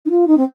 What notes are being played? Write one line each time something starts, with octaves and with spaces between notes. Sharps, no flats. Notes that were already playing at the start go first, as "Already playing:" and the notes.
D#4
F4
D#4
C4